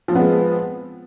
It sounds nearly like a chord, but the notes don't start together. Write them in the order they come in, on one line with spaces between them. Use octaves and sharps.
F3 C4 B3 G#3